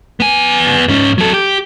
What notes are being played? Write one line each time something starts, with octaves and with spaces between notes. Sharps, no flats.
B3 G#5
G#2 C#4
F#3 A4
G4